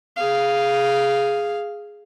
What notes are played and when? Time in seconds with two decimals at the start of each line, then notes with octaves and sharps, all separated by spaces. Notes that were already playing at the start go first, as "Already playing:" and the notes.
0.17 G#4 F5